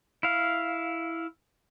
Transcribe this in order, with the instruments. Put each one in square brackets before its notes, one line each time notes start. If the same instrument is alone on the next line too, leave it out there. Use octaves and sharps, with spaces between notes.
[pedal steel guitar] E4 F5